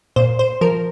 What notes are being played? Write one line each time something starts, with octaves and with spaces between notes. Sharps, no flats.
A#2 C5
C5
F3 A#4